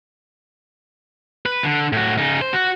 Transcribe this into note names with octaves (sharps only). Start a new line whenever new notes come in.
B4
D3
A2 F#4
C#3 D#4
C5
F#4